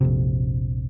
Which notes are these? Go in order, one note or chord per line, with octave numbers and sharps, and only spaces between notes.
A#1 F2 C3